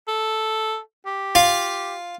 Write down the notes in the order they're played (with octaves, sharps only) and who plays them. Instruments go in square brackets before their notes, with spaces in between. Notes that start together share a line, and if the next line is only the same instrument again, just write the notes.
[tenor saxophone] A4
G4
[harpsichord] F4 F5